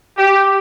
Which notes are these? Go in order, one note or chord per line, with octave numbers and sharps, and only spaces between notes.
G4